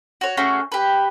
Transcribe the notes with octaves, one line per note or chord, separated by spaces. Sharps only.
F#4 C#5
A3 C#4 F#4 G#4
G4 B4